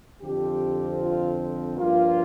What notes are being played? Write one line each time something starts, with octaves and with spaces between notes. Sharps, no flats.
F2 D3 F3 C4 G4
F4
G2 F3 A#3 F4